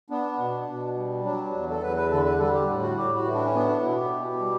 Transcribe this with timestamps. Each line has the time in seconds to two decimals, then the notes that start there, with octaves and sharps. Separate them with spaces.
0.10 B3 D4
0.38 B2
0.67 B2
0.96 G3
1.24 F#3 D4
1.54 E2
1.71 A4
1.81 E2 B4
1.96 B4
2.11 D3 A4
2.25 B4
2.39 G3 A4
2.53 G4
2.68 A2
2.82 F#4
2.97 A2 G4
3.15 F#4
3.25 E3
3.34 D4
3.45 C#4
3.55 B3 D4
3.68 D4
3.82 B2 E4
3.96 G4
4.11 B2
4.39 G3